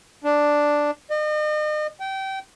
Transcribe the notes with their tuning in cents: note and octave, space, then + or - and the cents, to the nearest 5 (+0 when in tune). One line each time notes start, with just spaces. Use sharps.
D4 +0
D#5 -40
G5 -25